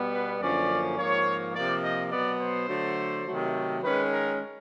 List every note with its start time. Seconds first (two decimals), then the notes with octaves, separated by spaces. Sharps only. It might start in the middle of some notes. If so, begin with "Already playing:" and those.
Already playing: B2 G3 B3
0.11 B4
0.40 F#2 D3 F3 A#3 C#4 D5
0.97 G#2 F3 A#3 C#5
1.54 C3 F3 A#3 D5
1.83 D#5
2.11 B2 F#3 B3 D5
2.40 C5
2.68 D3 F#3 A3
3.25 C3 D#3 F#3 A3
3.82 D#3 G#3 C#4 B4
4.11 A#4